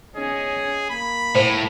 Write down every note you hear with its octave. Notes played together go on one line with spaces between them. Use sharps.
C#4 G#4 D#5
A#3 B5
A2 C5